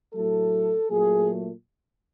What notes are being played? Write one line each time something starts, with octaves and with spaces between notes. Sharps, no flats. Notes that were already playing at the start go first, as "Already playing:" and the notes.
A2 F#3 A3 A4
A#2 F#3 A3 G#4